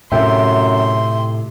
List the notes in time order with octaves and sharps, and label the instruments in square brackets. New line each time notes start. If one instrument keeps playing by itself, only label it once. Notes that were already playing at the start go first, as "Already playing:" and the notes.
[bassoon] F#2 [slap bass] A2 C3 [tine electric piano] E5 G5 [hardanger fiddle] C6